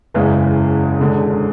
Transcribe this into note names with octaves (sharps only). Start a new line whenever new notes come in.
F#1 E2 C#3 E3 G#3
E1 E2 D3 G#3